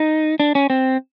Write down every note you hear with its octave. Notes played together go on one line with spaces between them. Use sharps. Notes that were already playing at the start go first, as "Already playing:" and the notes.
Already playing: D#4
D4
C#4
C4